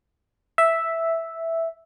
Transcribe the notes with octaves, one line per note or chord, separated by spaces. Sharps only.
E5